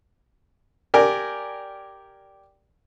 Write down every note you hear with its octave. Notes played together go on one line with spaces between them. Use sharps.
G4 A#4 D5 G#5